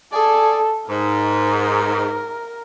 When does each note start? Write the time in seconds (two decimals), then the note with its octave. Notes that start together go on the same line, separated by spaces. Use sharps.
0.13 G#4 A4 D5
0.89 G#2 A#4